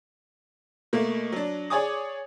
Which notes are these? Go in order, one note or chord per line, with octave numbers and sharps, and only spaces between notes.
B2 A3 A#3
F#3 D4
G#4 C#5 D5 G#5 D6 D#6